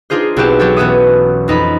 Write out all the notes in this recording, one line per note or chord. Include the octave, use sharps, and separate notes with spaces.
D4 D#4 F4 G#4 C5
B1 C4 E4 F#4 G4 E7
F#3 G4 A4 C#5
E1 B3 C#4 F#4 E5 D#6
F2 D#4 A4 B5